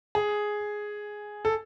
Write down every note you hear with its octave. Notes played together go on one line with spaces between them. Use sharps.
G#4
A4